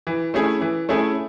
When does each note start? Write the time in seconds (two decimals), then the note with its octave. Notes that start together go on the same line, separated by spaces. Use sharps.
0.07 E3
0.34 A3 C#4 E4 G#4
0.61 E3
0.89 A3 C#4 E4 G#4